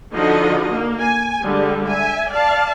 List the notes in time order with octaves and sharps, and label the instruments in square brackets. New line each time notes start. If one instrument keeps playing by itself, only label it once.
[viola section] D3 F3 D#4 F#4 A4 D#5
A#3
G#5
D3 G3 G#3 G4
E5 G#5
D5 F5 A5